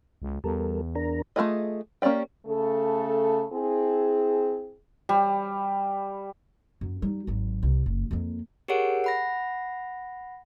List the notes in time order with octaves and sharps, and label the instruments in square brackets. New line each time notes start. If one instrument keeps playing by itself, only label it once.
[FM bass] C#2
[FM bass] E2 [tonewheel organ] G3 A4 A#4
[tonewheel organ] D4 A#4 A#5
[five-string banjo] A3 B3 F4 G#4 D#5
A#3 C#4 G4 D5 G5
[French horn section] C#3 A3 A4
C4 E4 G#4
[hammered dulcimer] G3
[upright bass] F#2
G3 D#4
G#1 F#3
C2
F#1
F2 A#3
[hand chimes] G4 G#4 A#4 C#5 F#5 D7
F#5 B5 A#6